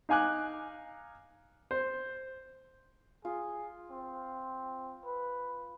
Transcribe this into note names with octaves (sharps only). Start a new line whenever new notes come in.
D#4 F5 G#5 D6 F#6
C5
F4 G#4
C4
B4